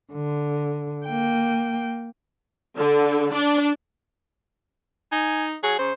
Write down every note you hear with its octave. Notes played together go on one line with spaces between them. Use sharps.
D3
A#3 G5
D3
D4
D#4 G#5
F#3 G#4
C#3 C5